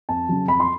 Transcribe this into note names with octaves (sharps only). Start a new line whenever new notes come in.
F2 A5
C#3 F#3
F2 B5
C6